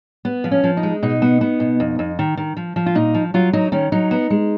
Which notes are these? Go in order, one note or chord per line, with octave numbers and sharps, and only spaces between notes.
B3
F3
C#4
F3
D#4
G#3
B2 D#4
B3
B3
B2
F2
F2
D#3
D#3
F3
F3
F4
A#2 D#4
F3
F#3 F4
F#3 D#4
D#3 C#4
F#3 D#4
B3
G#3